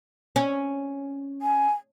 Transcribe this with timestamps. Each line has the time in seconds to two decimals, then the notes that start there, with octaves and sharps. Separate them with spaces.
0.36 C#4
1.42 G#5